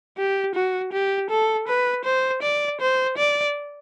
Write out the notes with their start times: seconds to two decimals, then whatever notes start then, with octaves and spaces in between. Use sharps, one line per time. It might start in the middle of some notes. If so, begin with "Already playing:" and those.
0.18 G4
0.55 F#4
0.93 G4
1.30 A4
1.68 B4
2.05 C5
2.43 D5
2.81 C5
3.17 D5